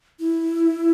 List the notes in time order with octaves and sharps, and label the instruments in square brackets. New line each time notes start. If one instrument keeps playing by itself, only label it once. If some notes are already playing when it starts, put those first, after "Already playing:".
[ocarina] E4